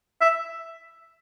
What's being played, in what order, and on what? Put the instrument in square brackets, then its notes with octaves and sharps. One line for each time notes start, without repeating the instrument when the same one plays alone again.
[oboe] E5